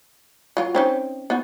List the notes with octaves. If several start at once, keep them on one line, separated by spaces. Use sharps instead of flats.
F#3 F4
C4 C#4 D#4
B3 D#4 F#4